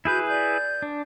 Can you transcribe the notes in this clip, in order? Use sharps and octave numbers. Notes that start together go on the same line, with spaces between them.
E4 F#4 G#4 B4 B5 G6
D5 G6
D4